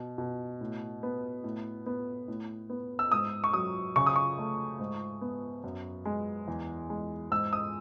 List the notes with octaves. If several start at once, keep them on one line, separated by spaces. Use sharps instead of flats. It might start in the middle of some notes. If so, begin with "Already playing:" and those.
Already playing: B2
B2
A2
B3
A2
B3
A2
B3
E6
G#2 D#6
C#6
F#3 D#6
C#3 C#6
D#6
C#6
A3
G#2
B3
F#2
G#3
E2
G#3
G#2 E6
D#6